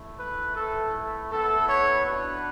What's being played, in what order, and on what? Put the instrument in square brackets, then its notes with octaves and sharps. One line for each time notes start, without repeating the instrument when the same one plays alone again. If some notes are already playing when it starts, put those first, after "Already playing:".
Already playing: [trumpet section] A3 E4
B4
A3 E4 A4
B3 E4 A4
C#5
B3 D4 F#4 B4